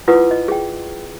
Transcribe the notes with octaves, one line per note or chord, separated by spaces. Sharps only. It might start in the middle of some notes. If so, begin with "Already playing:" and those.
E4 F4 B4 F#5 D6 D#6
D#5
G#4 G5